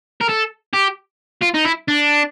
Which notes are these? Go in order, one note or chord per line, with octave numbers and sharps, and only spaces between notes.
A#4
A4
G4
F4
D#4
E4
D4